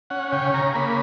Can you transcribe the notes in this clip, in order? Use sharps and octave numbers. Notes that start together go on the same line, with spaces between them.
C#4 F#5
C#3 G5
C#3 A#5
A#3 B5